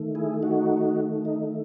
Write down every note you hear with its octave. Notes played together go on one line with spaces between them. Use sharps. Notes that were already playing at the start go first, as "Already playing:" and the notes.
Already playing: D#3 A3
E4 G#4
D#4 F#4
D#4